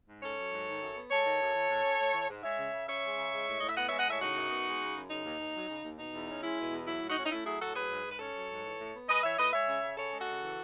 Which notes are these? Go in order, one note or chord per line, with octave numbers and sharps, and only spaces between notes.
G#2
C#4 A4 C#5
F#3
G#2
D#3
F#2
B3
G#3 A4 C#5
D#3
F#2
E3
G#2
C#4
A3
E3
G#2
G#3 C#5 E5
C#3
C#3
C#4 C#5 E5
G#3
C#3
G#3
A2
A2 D#5
E5
B3 D#5 F#5
G#3 C#5 E5
D#5 F#5
A2 C#5 E5
C#3 D#4 F#4
F#2
B3
G#3
C#3
F#2
C#3 D#4
D#2
D#2
F#3
C#3
D#2
B2 D#4
E2
C#4
G#3 E4
B2
E2
F#3 E4
A2
D#4 F#4
C#4
D#4
A3 E4
F#3 E4 G#4
A2 F#4 A4
F#3 G#4 B4
G#2
G#2
B4
C#4 A4 C#5
F#3
G#2
E3
A2
B3
G#3 B4 D#5
E3 C#5 E5
A2 B4 D#5
G#3 C#5 E5
C#3
C#3
C#4 A4 C#5
G#3
F#4 A4
C#3
E3